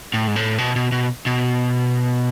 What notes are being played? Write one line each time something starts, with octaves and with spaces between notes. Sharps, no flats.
A2
G#2
A2
B2
B2
B2
B2